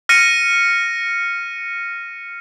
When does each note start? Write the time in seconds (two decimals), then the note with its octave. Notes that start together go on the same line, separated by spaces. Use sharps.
0.09 F6 A#6 C#7 D#7